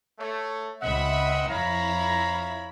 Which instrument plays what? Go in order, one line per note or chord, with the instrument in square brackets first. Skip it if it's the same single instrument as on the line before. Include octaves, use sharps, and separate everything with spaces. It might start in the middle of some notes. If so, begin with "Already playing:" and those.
[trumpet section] A3 C#5
[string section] C#2 E5 B5 [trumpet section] C4 D#5 F#5
[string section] F2 E4 B5 [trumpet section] C#5 F5 A#5